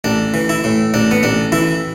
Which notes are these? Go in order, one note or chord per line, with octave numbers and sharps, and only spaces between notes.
A1 D4
E3
E4
A2
A1 D4
B3
A1 D4
E3 E4